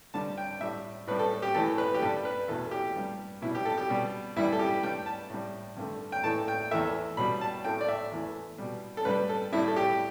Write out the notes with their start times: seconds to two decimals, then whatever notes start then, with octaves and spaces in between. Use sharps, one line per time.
0.14 G2 D3 G3 A5
0.37 G5
0.61 A2 G3 E5
1.07 A2 B4
1.11 G3
1.19 A4
1.42 G4
1.54 A2 E3 A3 A4
1.78 B4
1.94 G4
2.02 G2 G3 A4
2.25 B4
2.48 E2 B2 A3 A4
2.71 G4
2.96 G2 G3
3.42 B2 G3 E4
3.55 G4
3.65 A4
3.78 G4
3.90 B2 G3
4.36 G2 E3 G3 E4
4.52 A4
4.59 G4
4.83 G2 G3 G5
5.06 A5
5.30 A2 G3
5.77 G2 D3 A3
6.12 G5
6.23 A2 E3 A3 A5
6.48 G5
6.71 E2 E3 A3 E5
7.17 B2 G3 B5
7.41 A5
7.64 A2 A3 G5
7.81 D5
7.88 E5
8.11 E2 E3 A3
8.58 B2 G3
8.97 A4
9.05 G2 G3 B4
9.29 A4
9.53 A2 G3 E4
9.68 A4
9.76 G4